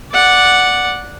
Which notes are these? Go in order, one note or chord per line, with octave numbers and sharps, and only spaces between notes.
D5 F#5